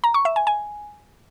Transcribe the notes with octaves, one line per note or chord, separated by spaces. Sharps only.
A#5
C#6
E5
G#5
G#5